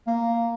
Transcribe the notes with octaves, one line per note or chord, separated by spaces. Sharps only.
A#3